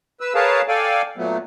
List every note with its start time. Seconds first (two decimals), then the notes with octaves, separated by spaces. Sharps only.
0.20 B4 E6
0.35 G#4 A#4 B4 C#5 F5 A5
0.68 A4 D5 F5 G5 G#5
1.17 A#2 F#3 A3 B3